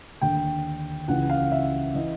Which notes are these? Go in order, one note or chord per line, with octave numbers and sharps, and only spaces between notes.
D#2 D3 G5
C#2 C#3 E3 F#5
F5
E5
E3 D#5